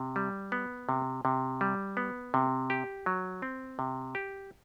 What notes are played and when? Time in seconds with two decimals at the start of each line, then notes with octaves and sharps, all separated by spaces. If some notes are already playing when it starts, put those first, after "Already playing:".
Already playing: C3
0.16 G3
0.52 B3
0.89 C3
1.25 C3
1.61 G3
1.97 B3
2.34 C3
2.70 G4
3.06 F#3
3.42 C4
3.79 C3
4.15 G4